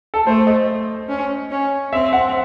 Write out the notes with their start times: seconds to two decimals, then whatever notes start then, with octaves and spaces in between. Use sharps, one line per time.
0.14 A4
0.26 A3 C5
0.47 D#5
1.09 C#4
1.51 C#4
1.93 C4 E5
2.13 F#5